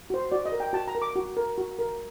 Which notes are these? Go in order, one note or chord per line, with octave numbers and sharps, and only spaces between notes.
F#4 C5
F#4 D5
D#5
A#4
G5
F#4 A5
A#5
A#4
D6
F#4
A#4
F#4
A#4